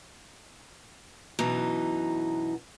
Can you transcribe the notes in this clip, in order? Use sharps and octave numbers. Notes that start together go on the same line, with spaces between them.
F#2 B2 E3 D#4